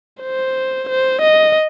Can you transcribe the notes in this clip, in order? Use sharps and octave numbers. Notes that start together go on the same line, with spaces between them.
C5
C5
D#5